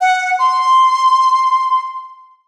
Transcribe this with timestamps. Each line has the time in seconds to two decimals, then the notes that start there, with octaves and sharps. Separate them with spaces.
0.01 F#5
0.39 C6